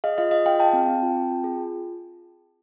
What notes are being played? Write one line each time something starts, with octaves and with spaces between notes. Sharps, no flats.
G#4 D#5 F5
F4 D#5 F5
G#4 D#5 F5
F4 F5 G5
G#4 G5 A5
C4
C4
F4
C4
F4
G#4
F4